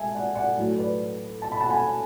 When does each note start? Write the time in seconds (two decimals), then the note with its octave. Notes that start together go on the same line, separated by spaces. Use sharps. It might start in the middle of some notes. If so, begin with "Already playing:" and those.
Already playing: G#3 E5 G#5 A5
0.14 D5 F#5
0.35 D5 F#5
0.57 A2 F#3 A3 D4
0.78 B4 D5
1.42 A5
1.52 B5
1.61 F#5 A5
1.70 G#5 B5